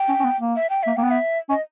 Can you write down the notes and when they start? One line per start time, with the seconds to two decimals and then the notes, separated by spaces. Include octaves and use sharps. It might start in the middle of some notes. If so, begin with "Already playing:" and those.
Already playing: G5
0.08 C#4
0.20 C#4
0.24 B3
0.40 A#3
0.56 E5
0.70 G5
0.83 A#3 E5
0.97 A#3 G5
1.03 B3
1.11 E5
1.49 C#4 D#5